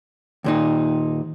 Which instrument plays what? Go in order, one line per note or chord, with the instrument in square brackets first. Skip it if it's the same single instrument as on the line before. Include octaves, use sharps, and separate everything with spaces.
[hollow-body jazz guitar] D#2 A#2 D#4